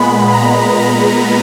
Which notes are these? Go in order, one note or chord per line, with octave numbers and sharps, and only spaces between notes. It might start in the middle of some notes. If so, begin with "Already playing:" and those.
Already playing: A#2 G#3 B3 B5
A#5
A#5